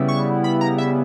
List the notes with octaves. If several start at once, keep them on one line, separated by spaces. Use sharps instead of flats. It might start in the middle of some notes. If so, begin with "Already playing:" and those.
Already playing: C#3 G3 B3 E4
C#6
B5
A#5
E5